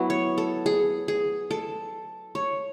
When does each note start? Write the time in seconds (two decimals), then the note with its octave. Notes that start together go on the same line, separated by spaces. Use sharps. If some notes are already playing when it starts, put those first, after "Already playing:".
Already playing: F#3 B3 E4
0.10 C#5
0.38 A4
0.66 G#4
1.08 G#4
1.51 A4
2.35 C#5